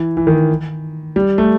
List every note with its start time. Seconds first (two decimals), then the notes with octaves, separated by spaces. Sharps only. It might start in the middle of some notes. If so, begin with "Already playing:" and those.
Already playing: E3
0.17 E3
0.27 D#3
1.16 G3
1.38 A3